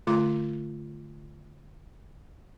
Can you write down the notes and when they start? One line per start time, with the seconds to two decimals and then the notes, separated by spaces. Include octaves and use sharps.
0.07 D3 A3 F4 C6 D6